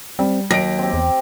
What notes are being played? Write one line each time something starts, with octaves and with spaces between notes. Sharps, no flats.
G3 C4
D#2 F#3 A#6 D7
C4 G4
E2